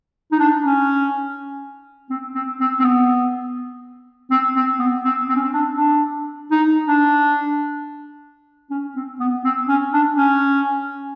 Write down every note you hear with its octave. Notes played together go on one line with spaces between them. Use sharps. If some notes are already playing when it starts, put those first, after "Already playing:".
D#4
D4
C#4
C4
C4
C4
C4
B3
C4
C4
B3
C4
C4
C#4
C4
D4
D4
D#4
D4
C#4
C4
B3
C4
C#4
D4
C#4